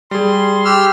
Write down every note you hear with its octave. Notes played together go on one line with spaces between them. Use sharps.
G3 G#4 C6
G4 E6 F6